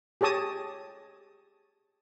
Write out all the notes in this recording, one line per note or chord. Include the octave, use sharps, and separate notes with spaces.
G4 G#4 C#5 A5 D#6